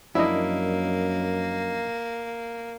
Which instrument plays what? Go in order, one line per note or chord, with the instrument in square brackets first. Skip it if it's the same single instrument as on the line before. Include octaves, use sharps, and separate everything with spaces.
[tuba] F#2 [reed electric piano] F3 D4 D#5 [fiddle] A#3 [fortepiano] E4